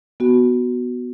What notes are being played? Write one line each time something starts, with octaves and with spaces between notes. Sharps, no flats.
B3 F#4